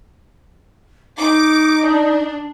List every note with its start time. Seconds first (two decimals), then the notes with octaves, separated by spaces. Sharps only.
1.18 D#4 D6
1.84 D4